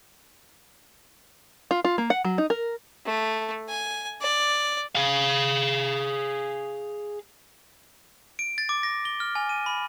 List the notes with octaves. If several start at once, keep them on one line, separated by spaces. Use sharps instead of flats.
F4
F4
A#3
F#5
F#3
D#4
A#4
A3
G#5
D5
G#4 F5
D7
A6
D6
A#6
G7
F6
G#5
D#7
B5